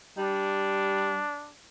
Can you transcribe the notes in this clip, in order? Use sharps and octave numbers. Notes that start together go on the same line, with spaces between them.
G3 D4